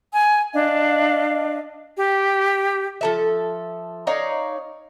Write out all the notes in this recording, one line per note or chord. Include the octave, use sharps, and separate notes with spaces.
G#5
D4 D#5 F5
G4
F3 A4 E5
D#4 C#5 D5 F5